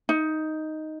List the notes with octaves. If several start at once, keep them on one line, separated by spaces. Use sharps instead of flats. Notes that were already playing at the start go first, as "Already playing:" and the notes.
D#4